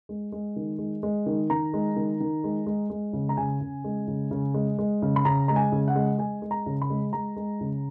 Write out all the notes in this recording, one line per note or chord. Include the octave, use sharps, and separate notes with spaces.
G#3
G#3
D#3
G#3
G#3
D#3
D#3 A#5
G#3
D#3
D#3
G#3
G#3
G#3
C#3
A#5
C#3 G#5
C#3
G#3
C#3
C#3
G#3
G#3
C#3
B5
C#3 A#5
G#3 A#5
G#5
C#3
F#5
G#3
G#3 G#5
G#3
A#5
C#3
B5
G#3
G#3 A#5
G#3
C#3